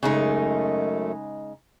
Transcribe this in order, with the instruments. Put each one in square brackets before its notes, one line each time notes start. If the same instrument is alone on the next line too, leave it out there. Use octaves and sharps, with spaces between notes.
[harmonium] F#2 A3 [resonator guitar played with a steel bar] C#3 G#3 D#4